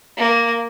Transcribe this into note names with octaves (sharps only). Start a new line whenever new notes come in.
A#3